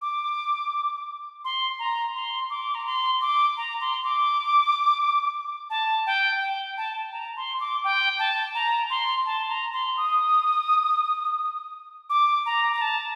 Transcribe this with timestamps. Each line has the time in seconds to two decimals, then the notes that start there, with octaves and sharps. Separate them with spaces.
0.02 D6
1.45 C6
1.79 A#5
2.15 C6
2.50 D6
2.75 A#5
2.86 C6
3.21 D6
3.57 A#5
3.81 C6
4.04 D6
5.70 A5
6.07 G5
6.41 G5
6.77 A5
7.12 A#5
7.37 C6
7.60 D6
7.84 G5
8.19 A5
8.55 A#5
8.90 C6
9.26 A5
9.49 A#5
9.73 C6
9.97 D#6
12.10 D6
12.46 A#5
12.73 A#5
12.81 A5